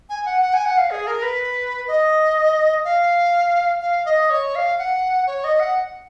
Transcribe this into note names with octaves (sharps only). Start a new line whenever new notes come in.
G#5
F#5
F#5
G#5
F#5
F5
G#4
A#4
B4
D#5
F5
F5
D#5
C#5
F5
F#5
C#5
D#5
F#5